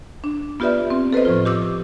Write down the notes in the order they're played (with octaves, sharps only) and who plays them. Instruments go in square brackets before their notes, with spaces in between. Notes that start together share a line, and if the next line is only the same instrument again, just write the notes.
[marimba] D4
B3 F4 G4 B4 D5 E5
C4
A4 B4 C5 D#5
A2 F3 F4
G4 D6 E6